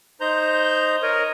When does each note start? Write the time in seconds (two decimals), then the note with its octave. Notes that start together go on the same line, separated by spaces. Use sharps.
0.21 D#4 C5 A#5 G6
1.03 A#4 C#5 D#5